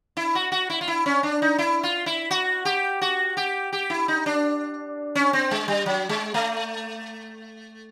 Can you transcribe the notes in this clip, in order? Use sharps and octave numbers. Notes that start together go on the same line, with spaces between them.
E4
F#4
F#4
E4
F4
E4
C#4
D4
D#4
E4
F4
E4
F#4
G4
F#4
G4
G4
E4
D#4
D4
C#4
C4
G#3
G3
F#3
G#3
A3